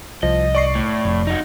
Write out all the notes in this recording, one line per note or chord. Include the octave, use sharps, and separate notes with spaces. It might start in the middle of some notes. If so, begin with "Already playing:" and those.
C2 F3 D#5
D5 C#6 C7
A2
F1
D#4 F#4